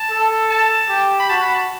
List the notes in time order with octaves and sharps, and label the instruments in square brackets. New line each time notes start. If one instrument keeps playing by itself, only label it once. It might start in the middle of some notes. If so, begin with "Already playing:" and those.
Already playing: [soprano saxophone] A5
[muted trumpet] A4
[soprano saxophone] A5
[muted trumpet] G4
[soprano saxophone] B5
[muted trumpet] F#4 [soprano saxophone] A5
[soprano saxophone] B5
A5